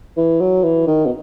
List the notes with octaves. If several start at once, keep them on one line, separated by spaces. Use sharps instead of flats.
E3
F#3
E3
D#3
B2